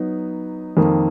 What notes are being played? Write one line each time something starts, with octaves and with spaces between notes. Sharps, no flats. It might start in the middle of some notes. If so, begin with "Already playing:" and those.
Already playing: F#3 B3 D#4
F2 D#3 A#3